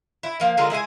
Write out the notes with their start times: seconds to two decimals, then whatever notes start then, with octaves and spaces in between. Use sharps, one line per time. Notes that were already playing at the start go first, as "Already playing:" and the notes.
0.23 E4
0.40 F3 A#3
0.57 D3 G#3 F4 A#4
0.70 G#3 E4 G#4 G#5